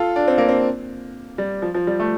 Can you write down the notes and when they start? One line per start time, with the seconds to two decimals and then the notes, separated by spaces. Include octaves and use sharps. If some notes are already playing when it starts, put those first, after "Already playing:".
Already playing: F4 A4
0.16 D4
0.28 C4
0.38 A#3
0.49 C4
1.38 G3
1.62 F3
1.74 F3
1.87 G3
2.00 A3